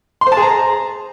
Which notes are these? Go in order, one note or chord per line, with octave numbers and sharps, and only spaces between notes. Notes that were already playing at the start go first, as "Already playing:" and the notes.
C6
C5
A5
G#4
A#5